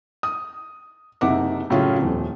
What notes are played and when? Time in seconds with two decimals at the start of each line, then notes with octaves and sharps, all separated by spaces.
0.23 D#6
1.21 F#1 C3 D#4 E5 F#5 D6
1.70 A2 C#3 F#3 C#4 F4
1.99 D#1 F2